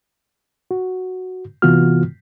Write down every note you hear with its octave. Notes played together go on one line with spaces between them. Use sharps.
F#4
C3 E3 B3 F4 F#4 F6